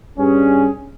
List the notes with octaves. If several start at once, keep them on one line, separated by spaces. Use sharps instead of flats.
G2 C#4 G#4